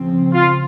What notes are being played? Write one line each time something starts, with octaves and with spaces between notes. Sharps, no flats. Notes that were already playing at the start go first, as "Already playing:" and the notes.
Already playing: C#3 F3 C4
F4